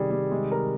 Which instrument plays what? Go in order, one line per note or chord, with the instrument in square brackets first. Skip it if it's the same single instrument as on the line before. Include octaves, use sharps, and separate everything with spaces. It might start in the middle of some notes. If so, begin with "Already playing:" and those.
Already playing: [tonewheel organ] C3 D#3 [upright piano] G3 G#4 D5
[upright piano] G3
G#3
A#4